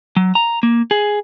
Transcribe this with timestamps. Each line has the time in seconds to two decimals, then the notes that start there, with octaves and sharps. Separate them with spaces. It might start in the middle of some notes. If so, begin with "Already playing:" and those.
0.17 F#3
0.35 A#5
0.63 A#3
0.91 G#4